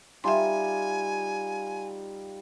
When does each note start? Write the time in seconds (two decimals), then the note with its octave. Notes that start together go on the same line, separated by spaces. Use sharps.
0.24 G3 D#4 F4 E5 G5 G#5 C6